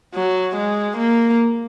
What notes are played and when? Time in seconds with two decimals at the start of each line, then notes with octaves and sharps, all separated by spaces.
0.15 F#3
0.56 G#3
0.97 A#3